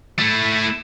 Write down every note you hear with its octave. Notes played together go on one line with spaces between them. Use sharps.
A3 E4